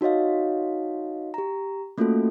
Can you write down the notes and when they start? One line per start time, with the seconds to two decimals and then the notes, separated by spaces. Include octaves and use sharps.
0.01 D#4 F#4 C#5 D#5 F5
1.34 G4 A#5
1.98 A3 A#3 C#4 F4 F#4 A4